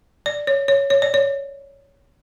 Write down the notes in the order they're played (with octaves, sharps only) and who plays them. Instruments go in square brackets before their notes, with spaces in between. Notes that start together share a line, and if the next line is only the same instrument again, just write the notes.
[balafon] D5
C#5
C#5
C#5
D5
C#5